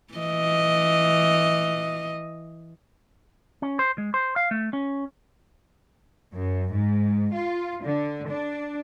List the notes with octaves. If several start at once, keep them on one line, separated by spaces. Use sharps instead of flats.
E3 D#5
C#4
C5
G#3
C5
F5
A3
C#4
F#2
G#2
F4
D3
D4